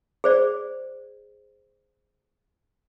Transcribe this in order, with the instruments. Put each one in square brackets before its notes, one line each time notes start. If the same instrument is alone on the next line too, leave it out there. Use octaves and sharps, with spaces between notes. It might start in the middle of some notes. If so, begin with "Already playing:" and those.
[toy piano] G#4 C5 D5